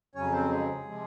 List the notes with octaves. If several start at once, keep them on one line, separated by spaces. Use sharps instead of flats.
F2 C#3 F#3 C#4 C#5
C4 C5
G#3 G#4
C3 F3 G#3